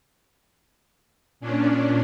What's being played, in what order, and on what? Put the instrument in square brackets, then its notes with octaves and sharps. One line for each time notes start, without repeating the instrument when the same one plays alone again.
[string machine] A#2 C#4 D4